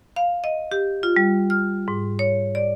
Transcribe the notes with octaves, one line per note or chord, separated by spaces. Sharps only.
F5
D#5
G4
F4
G3
F6
G#2
C#5
D5